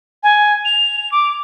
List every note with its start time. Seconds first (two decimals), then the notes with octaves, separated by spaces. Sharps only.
0.23 G#5
0.65 F7
1.12 D6